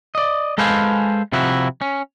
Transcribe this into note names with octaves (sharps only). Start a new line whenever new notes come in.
D5 D#5
G#3 A4 B4 C5 F5 G#5
C3 F3 E4 F#4
C#4